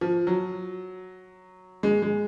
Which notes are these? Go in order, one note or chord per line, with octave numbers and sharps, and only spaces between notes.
F3
F#3
G#3
G#3